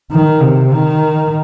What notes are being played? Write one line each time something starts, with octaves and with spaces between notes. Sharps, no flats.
D#3
C3
D#3